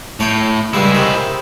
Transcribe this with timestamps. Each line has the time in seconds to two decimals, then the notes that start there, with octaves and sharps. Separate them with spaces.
0.20 A2 C#5 G5
0.74 C#2 G3 G#3 E4
0.95 C3 D#3